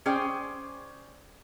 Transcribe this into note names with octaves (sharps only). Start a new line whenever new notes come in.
C#4 G#4 C5 D5 G5